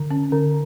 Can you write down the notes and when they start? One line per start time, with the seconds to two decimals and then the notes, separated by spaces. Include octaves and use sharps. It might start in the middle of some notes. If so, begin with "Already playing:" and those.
Already playing: D3
0.11 C#4
0.32 D3